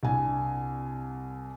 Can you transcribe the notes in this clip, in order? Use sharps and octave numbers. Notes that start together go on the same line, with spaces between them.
C2 D4 G#5